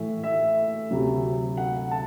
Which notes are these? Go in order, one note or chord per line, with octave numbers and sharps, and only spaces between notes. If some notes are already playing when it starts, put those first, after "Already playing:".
Already playing: A2 E3 A3 E5
E5
D2 C3 F#3
F#5
A5